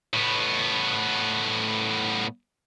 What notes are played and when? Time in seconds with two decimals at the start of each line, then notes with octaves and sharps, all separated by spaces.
0.13 A2 B3